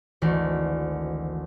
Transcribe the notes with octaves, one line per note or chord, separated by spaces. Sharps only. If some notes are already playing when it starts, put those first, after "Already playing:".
G#1 D2 E3